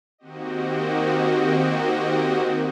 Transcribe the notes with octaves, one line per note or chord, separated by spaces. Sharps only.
D#3 A#3 C4 F#4 G4 D#5